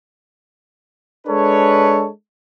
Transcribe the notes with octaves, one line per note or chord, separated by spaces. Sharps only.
G#3 D4 G#4 A4 B4 C#5